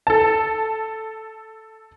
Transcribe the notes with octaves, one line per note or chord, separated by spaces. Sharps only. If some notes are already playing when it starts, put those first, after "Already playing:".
A4 A5